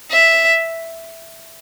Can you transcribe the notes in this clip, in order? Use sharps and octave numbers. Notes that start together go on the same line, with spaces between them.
E5